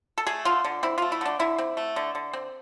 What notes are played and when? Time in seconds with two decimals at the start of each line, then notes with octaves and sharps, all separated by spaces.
0.18 A4
0.27 A3 G#4
0.45 D3 F4
0.64 D3
0.83 C4 E4
0.98 A3 F4
1.12 E4
1.21 D3 D4
1.39 D3 E4
1.58 C4
1.77 A3
1.96 D3
2.15 D3
2.33 C4